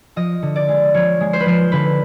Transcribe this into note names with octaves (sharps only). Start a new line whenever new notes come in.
F3 D#5
D3
D5
G#3
F3 C#5
G#3
C5
B4
F3 C5
D3 B4